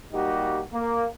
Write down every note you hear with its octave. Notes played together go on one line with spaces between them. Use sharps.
G3 A#3 D#4 F#4 G4
A#3